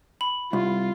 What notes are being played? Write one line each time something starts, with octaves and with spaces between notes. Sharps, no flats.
B5
C2 F4